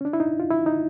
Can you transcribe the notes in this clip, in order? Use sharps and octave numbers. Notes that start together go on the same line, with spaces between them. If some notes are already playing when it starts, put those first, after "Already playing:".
C#4
D4
E4
D#4
F4
E4
D#4